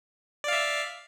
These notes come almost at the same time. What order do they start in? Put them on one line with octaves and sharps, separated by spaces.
D5 F5 E5